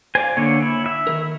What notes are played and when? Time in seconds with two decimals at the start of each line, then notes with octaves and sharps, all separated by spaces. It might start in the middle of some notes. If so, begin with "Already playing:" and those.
0.15 C5 D5 F5 G#5
0.37 D3 A#3 C#5
0.62 E4
0.86 E5
1.07 D#3 A#4